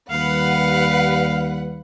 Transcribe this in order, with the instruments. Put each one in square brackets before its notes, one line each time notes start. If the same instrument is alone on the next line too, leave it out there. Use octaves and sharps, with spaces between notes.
[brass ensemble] D#2 G3 [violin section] B4 F#5 [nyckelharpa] F5